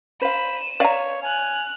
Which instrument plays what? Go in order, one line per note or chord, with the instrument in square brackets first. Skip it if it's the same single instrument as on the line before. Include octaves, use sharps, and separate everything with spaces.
[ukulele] C5 F5 [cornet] B5 [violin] D#7 E7
[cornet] C#5 [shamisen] D5 A#5 [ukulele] E5 F5
[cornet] G#5 [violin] F6 F#6